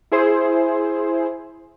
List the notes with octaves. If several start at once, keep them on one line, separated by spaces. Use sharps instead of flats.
E4 G#4 C5